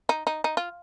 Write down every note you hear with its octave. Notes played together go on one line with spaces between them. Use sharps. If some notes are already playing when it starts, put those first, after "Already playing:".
D#4
D#4
D#4
F4